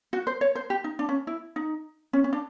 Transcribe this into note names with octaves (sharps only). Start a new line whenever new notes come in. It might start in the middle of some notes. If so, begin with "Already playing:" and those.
F#4
C5
C#5
C5
G4
D#4
D4
C#4
E4
D#4
C#4
C#4
D4